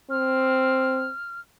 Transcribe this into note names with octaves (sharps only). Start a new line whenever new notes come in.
C4 F6